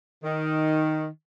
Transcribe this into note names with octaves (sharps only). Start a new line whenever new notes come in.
D#3